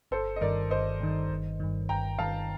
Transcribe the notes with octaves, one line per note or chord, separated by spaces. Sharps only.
G1 A4 C5
D#5
G2 D#3 A#4 D5
G1 C5 D#5
G2 D#3
G1
G2 D#3
G1 G5 A#5
G2 D#3 F5 A5